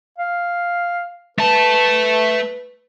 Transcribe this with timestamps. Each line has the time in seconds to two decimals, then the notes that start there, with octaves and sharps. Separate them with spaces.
0.18 F5
1.39 A3 B4 A5